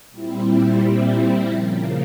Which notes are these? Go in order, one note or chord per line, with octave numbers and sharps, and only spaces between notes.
A#2 G3 C4 E4
C#3 F3 A#3